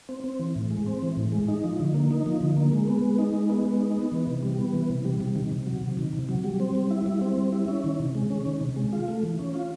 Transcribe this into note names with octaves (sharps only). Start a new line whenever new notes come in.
C4
C4
E3
A2
G#3
C4
E3
A2
G#3
D#4
F3
D3
A#3
D#4
F3
D3
A#3
G#3
B3
G#3
D#4
G#3
B3
G#3
D#4
B3
E3
C3
G3
B3
E3
C3
G3
C3
D#3
C3
F#3
C3
D#3
C3
F#3
G3
C4
G3
E4
G3
C4
G3
E4
C#4
D#3
C3
G#3
C#4
D#3
C3
G#3
F4
A3
E3
C#4
F4